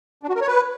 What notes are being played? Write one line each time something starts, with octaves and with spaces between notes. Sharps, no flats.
D4
F#4
A#4
C#5
B4